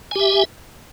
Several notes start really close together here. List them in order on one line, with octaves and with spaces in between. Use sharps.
G#5 G4 E5